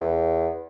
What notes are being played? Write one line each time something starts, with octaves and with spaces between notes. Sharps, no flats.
E2